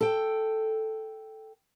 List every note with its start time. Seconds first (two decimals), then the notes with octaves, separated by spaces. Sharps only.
0.01 A4 G5